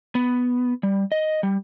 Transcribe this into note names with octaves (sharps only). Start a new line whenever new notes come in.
B3
G3
D#5
G3